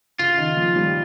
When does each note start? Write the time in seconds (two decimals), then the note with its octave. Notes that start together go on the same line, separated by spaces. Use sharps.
0.19 C#3 F4
0.38 D#3
0.57 F3
0.76 G3